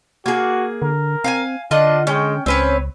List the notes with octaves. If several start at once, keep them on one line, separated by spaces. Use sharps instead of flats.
A#3 F#4 G#4
D3 A#4
C4 F5 G5 G#5
D3 D4 F4 D#5 F#5
G#3 C#4 G5
C#2 C4 C#4 B4 C#5